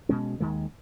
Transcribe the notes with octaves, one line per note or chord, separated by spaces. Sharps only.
B2 G#3 C#4
D#2 D#3 G#3